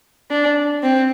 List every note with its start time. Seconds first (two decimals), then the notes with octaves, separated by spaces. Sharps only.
0.31 D4
0.83 C4